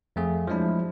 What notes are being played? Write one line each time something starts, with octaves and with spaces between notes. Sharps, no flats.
F2 A3 G#4
F3 F#3 G#3 D4 E4